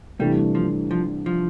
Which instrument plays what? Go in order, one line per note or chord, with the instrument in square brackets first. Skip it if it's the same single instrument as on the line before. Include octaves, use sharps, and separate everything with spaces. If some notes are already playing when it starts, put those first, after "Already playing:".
[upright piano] C2 C3 E3 A3 D4 [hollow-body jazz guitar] G3
[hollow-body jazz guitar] F3
F3
F3